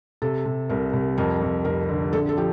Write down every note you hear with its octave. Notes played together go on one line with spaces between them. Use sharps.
C3 A4
C3
C2 A#4
C2
F2 A#4
F2
F1 A#4
D3
A#1 A4
A4
F3 G4